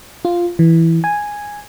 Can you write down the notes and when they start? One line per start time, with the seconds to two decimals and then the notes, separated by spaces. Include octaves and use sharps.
0.25 F4
0.59 E3
1.04 G#5